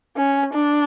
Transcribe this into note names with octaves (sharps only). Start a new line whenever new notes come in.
C#4
D4